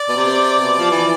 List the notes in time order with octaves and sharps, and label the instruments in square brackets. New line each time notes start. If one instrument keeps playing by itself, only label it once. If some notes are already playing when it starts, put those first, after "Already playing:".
Already playing: [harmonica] D5
[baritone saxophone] B2
C3
B2
F3
E3